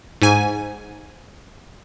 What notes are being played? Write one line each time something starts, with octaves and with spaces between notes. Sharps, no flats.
G#2 G#5